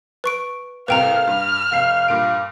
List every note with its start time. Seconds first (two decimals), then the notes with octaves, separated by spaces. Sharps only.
0.24 B4 C#6 D7
0.88 C2 A2 C3 B4 F5 G5 A#5 F6
1.27 G2 F6
1.72 F1 F5 C7 F7
2.08 G2 A#2 D7